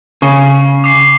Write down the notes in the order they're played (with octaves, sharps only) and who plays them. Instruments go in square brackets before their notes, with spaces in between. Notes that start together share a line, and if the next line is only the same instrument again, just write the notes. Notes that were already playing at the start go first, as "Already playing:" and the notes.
[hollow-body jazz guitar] C#3 [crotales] C#6
[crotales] D6 C7